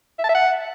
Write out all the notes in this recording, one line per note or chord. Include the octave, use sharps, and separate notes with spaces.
E5
A5
E5
F#5